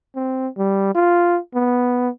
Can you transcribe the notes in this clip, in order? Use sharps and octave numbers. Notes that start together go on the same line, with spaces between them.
C4
G3
F4
B3